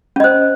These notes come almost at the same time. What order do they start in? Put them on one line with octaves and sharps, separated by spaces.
C#4 D#5 C5